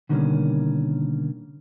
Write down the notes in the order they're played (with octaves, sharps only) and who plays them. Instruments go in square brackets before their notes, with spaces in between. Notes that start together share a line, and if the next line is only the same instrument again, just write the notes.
[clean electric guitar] B2 D3 D#3 G3 A#3 C#4